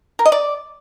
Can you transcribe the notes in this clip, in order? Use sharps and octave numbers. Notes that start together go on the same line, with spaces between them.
A#4
D#5
D5